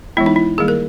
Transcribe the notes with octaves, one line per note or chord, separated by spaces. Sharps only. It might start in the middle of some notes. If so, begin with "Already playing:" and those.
E3 G#3 B3 E4
D#4
E4
D#3 G3 A#3 G#4
A#4